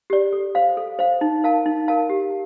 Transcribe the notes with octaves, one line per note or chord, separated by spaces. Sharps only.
G4 D5
A4
C5 F5
A4
C5 F5
D#4
A#4 F5 A5
D#4
A#4 F5 A5
G4